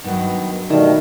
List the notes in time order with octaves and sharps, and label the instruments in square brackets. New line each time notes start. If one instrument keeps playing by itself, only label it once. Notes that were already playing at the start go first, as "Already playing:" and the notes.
[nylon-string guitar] G2 F#3 [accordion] D#3 B3
[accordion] B2 G3 A3 [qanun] D#3